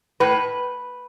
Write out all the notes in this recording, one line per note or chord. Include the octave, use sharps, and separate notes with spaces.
A2 B4